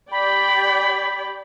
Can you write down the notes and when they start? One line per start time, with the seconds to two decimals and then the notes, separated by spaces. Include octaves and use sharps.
0.12 G4 D5 G5 B5